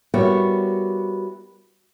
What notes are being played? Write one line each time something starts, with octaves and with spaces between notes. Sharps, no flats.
G3 B3 E4 F#4 A#4 C#5